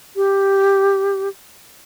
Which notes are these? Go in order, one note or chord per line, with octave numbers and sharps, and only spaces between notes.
G4